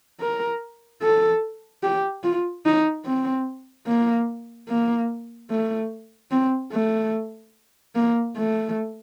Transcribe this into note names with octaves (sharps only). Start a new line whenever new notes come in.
A#4
A4
G4
F4
D#4
C4
A#3
A#3
A3
C4
A3
A#3
A3